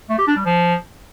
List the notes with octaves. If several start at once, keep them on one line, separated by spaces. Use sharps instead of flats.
A3
G4
D4
G3
F3